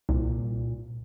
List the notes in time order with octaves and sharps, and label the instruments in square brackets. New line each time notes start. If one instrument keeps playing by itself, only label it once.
[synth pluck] C2 [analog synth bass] A#2